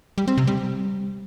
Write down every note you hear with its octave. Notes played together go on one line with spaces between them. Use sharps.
G3
C4
C3
G3